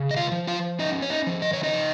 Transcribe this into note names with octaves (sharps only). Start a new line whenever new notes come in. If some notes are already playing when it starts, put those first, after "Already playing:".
Already playing: C#3
D#5
F4 F5
F3
F4 F5
C#4 D#4 D#5
C#5
D#4 D#5
F3
D#5
C#5
D#4 D#5
F3